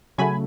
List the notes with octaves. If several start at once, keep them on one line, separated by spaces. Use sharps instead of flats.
C#3 F#3 A3 G#5 B5